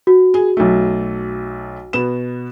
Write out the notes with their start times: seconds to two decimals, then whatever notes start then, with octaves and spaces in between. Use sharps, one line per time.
0.07 F#4
0.34 G#4
0.57 B1 A3
1.93 B2 B3 E7